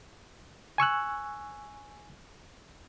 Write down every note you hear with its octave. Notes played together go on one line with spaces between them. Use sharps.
G#5 C#6 E6 F#6